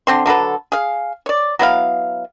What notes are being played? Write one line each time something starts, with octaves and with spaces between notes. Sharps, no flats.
D3 C4 C6
D3 F#3 A4 B4
G#4 F5
C#5 D5
F#3 B3 E4 F5